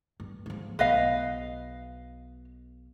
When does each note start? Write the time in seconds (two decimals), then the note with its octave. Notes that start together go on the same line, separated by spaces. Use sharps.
0.20 G2
0.46 G#2 F3
0.79 B1 B4 D#5 F5